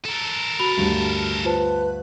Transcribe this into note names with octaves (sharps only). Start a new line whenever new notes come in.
A4 A#4
F#4 B5 F7
D2 G2
F4 B4 C5 A5